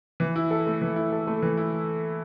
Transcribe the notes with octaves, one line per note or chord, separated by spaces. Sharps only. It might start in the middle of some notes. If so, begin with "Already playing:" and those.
E3
E4
A4
A3
E3
E4
A4
A3
E3
E4